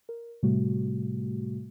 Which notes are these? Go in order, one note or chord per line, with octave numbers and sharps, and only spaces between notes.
A#4
A2 C3 G3 A3 F#4